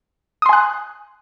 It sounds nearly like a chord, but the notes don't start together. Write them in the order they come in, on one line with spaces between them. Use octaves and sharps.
D#6 C6 G#5 F#6